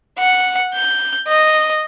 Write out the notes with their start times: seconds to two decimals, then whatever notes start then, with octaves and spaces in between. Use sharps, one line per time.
0.19 F#5
0.74 G6
1.27 D#5